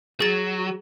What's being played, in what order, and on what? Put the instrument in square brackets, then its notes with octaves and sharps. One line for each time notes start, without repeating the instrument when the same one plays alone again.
[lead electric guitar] F#3 [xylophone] G#4 A6